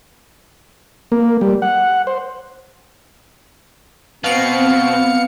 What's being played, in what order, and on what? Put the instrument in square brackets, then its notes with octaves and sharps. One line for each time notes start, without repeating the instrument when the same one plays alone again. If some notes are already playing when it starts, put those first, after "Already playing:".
[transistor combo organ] A#3
G3
F#5
C5
[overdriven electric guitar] B2 [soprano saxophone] B3 [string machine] C4 [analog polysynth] F5 C#7